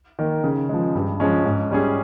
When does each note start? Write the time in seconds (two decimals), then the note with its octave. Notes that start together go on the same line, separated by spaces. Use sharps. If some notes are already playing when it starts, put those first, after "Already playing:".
0.19 D#3 A#3
0.44 C#3
0.69 F3 G#3
0.95 G2
1.20 F3 G#3 C#4
1.46 G#2
1.71 G3 C#4 G#4